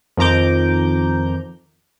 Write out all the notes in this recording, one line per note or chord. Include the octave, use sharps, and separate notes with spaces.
F2 D#3 F3 A#5 D6 G6